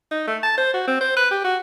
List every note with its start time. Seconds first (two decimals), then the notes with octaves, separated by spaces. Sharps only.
0.11 D#4
0.28 A3
0.43 A5
0.58 C5
0.74 F#4
0.87 C4
1.01 C5
1.16 B4
1.31 G4
1.45 F#4